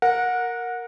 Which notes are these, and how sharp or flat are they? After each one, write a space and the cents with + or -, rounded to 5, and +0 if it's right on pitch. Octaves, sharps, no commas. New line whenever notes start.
A#4 +0 F#5 -20